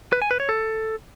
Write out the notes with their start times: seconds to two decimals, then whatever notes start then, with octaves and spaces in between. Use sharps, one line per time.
0.13 B4
0.22 G#5
0.31 B4
0.40 C#5
0.49 A4